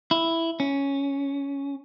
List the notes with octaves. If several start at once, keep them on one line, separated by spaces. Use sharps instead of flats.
E4
C#4